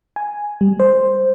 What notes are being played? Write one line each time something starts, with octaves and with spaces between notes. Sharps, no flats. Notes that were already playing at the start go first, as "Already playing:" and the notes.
G#5
G3
C5